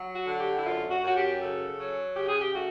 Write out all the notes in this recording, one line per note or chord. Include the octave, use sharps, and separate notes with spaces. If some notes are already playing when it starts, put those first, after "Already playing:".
Already playing: F#3
F#4
D3
G4
E4
F#2 F4
F#4
F#2 F#4
G4
C#3 A4
F#3
C#3 G4
G#4
G4
A3 F#4